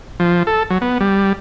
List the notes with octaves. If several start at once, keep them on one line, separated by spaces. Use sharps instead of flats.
F3
A4
F#3
B3
G3